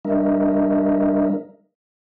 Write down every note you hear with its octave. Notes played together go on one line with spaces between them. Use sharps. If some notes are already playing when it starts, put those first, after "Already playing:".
G3 D4 A#4 D#5 E5